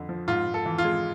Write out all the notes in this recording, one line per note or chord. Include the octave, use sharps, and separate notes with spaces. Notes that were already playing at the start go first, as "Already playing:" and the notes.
Already playing: F2 D3
F3
G#2 F4
G#2
A4
E3
F4
G#3